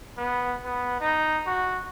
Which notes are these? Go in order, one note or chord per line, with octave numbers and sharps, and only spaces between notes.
B3
B3
D#4
F#4